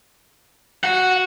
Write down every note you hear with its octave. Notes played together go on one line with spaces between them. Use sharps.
F#4 F#5